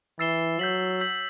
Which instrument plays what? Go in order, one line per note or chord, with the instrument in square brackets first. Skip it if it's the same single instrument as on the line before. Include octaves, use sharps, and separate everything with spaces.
[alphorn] E3 [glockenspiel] E6 A6 C7 E7 G7
[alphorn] F#3 [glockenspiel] E6 G6 B6 F#7
[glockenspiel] E6 G6 B6 F#7